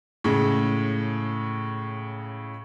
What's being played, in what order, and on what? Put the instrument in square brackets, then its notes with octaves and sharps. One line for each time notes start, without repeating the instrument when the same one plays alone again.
[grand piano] A2 C#3 G#3